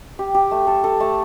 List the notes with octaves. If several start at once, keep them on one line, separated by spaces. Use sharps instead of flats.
G4
G4
A3
A4
A4
A3